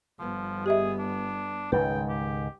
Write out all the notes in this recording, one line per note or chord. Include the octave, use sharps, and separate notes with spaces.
G1 F3 B3
G4 G#4 D#5 E5
D4
C#2 G#2 D#3 B4 G5
G4